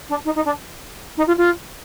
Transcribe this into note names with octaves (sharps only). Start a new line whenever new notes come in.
D4
D#4
D#4
D4
D#4
F4
F4